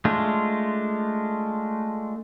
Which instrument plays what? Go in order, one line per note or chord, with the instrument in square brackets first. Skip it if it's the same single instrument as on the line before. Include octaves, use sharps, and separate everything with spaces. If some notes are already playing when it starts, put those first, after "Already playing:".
[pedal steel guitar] G#3 A3 D4 F4